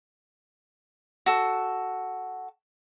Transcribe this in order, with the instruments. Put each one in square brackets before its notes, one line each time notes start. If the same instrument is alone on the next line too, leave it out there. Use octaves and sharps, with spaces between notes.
[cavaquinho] F#4 A4